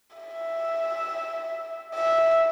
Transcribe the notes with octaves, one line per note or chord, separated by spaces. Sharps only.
E5
E5